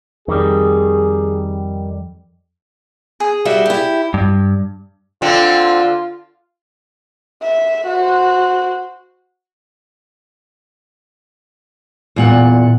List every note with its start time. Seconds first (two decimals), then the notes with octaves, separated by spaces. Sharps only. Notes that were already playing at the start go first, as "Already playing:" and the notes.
0.28 F2 D#3 G3 G#4
3.20 G#4
3.45 G3 F#4 E5
3.66 E4 G4
4.14 G2
5.22 D3 C4 F4
7.42 E5
7.87 F#4 C5
12.16 E2 A#2 F#5